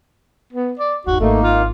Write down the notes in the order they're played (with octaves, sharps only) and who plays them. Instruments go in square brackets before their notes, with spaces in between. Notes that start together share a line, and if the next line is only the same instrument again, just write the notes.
[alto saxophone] B3
D5
[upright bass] G1 E2 [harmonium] G#2 [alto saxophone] F#4
[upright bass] G#1 [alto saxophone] A3 [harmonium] A#3 D#4
[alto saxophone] F4